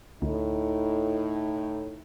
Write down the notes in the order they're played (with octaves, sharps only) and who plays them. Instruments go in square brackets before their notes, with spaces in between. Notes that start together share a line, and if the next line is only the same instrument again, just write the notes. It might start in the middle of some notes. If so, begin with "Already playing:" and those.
[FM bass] D2 [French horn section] A2 D#4